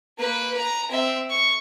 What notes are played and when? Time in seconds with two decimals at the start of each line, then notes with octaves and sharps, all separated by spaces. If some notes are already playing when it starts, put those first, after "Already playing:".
0.18 A#3 B4
0.54 B4 A#5
0.90 C4 E5
1.30 C#6